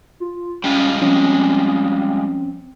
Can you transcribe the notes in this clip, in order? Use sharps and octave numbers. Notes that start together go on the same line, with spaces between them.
F4
G3 G#3 C#4 F4
F3 C4 C#4